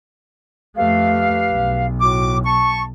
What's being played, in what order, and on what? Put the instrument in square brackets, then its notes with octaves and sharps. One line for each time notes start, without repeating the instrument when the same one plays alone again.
[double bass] F2 A3 [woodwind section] G4 B4 F5
[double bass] B1
[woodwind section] A2 F#4 D6
A5 C#6